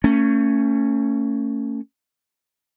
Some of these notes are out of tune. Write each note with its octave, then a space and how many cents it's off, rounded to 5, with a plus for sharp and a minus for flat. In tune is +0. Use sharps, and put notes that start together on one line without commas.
A3 +40 C#4 +0